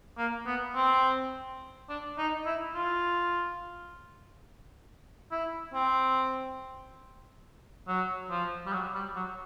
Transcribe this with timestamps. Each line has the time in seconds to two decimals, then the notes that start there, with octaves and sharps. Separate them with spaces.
0.18 A#3
0.47 B3
0.75 C4
1.89 D4
2.18 D#4
2.46 E4
2.75 F4
5.31 E4
5.74 C4
7.88 F#3
8.30 F3
8.66 G3
8.73 F#3
8.95 G3
9.16 F#3